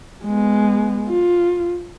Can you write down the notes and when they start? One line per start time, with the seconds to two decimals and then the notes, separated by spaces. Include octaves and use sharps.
0.25 G#3 B3
1.09 F4